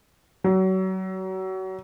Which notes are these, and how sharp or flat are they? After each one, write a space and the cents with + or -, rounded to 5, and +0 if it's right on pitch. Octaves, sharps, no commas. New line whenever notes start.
F#3 +30